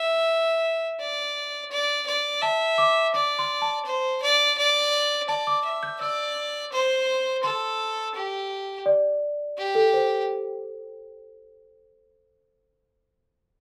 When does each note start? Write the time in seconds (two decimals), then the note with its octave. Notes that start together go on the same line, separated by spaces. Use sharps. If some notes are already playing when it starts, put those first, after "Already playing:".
Already playing: E5
1.00 D5
1.71 D5
2.07 D5
2.42 E5 A5
2.78 D6
3.14 D5 D6
3.39 C6
3.62 A5
3.85 C5
4.22 D5
4.58 D5
5.28 D5 A5
5.47 D6
5.65 E5
5.83 G6
6.01 D5 E6
6.72 C5
7.44 A4 C6
8.15 G4
8.86 D5
9.58 G4
9.75 A4
9.94 C5